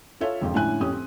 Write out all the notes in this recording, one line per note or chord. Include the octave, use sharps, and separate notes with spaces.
F4 A4 C#5 E5 F5
E1 F2 F3
A2 D3 C#4 E4 G#5 F#6
F2 C#4 G4 D#6
C4